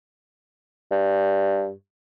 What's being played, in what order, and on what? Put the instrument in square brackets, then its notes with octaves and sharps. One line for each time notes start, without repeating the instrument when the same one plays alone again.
[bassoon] G2